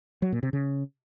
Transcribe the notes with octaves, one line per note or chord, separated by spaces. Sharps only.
F#3
A#2
C3
C#3